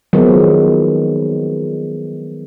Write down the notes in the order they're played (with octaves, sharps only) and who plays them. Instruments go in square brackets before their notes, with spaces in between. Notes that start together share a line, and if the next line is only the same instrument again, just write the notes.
[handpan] D#3 F3 F#3 G#3 B3